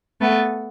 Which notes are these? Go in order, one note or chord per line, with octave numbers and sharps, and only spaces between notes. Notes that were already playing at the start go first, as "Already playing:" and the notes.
A3 B3